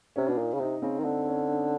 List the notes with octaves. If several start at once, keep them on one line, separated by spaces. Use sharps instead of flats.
C3 C#4
B2 D4
A#2 D#4
C#3
C3 D#4
C#3 C4
D#3
D3 C4
C#4
D4